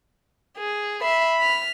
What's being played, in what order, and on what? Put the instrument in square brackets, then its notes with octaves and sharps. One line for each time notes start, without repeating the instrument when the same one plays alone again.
[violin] G#4
[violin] E5 C7 [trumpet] B5
[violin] F6 B6